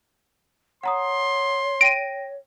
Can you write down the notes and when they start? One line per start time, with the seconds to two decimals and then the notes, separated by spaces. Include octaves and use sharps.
0.83 C#5 F#5 A#5 C6 D#6
1.81 G5 A#6 D7 D#7